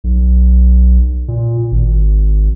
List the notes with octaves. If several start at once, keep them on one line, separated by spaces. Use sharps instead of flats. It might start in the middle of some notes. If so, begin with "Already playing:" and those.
B1
A#2
G#1